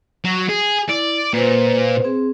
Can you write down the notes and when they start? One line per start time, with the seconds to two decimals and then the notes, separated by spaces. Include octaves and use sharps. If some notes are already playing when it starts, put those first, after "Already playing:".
0.24 F#3
0.49 G#4
0.89 E4 D5
1.33 A#2 B4 C5
2.04 C4 G#4